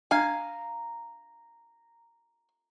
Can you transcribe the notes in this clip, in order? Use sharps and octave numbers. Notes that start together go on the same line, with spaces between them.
D4 F5 G#5 A#5